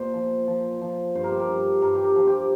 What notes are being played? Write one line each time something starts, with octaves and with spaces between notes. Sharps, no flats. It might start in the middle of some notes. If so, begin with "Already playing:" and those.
Already playing: A#2 C5
F3
F3
F3
G2 C5
A#4
G4
A#4
G2
G2 A#4
G4
A#4
F3
G4